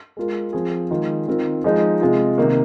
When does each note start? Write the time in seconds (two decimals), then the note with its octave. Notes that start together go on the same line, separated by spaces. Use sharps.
0.17 G#3 F4 A#4
0.53 F3 C4 G#4
0.91 D#3 G#3 F4 G#4
1.28 D#3 C4 F4 A#4
1.64 F3 G#3 D#4 G#4
2.01 C3 G#3 F4 G#4
2.38 C3 D#3 A#3